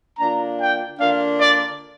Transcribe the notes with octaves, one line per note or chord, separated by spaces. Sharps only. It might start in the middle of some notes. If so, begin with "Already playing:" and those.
D3 A#3 D4 F4 A#5
G5
D3 A#3 D4 F4 F5
D5